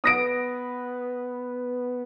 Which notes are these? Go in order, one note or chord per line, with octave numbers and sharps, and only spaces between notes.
B3 D#6 A#6 D7